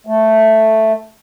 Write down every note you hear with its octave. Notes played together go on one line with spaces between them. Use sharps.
A3